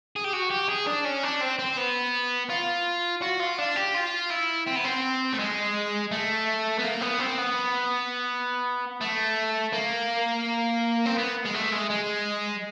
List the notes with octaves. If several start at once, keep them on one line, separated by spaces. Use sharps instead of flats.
G#4
G4
F#4
G4
G#4
D4
C#4
D4
C4
C4
B3
F4
F#4
F4
D4
G4
F4
E4
C4
B3
C4
A3
G#3
A3
B3
A#3
B3
C4
B3
A3
A#3
C4
B3
G#3
A3
G#3
G#3